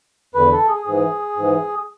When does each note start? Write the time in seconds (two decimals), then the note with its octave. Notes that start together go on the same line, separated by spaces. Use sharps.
0.35 E2 D3 B4
0.52 A4
0.69 G#4
0.86 G#2 E3
1.37 G#2 E3